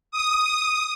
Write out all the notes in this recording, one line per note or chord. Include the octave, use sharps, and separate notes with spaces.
D#6